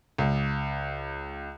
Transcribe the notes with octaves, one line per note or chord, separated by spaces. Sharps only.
C#2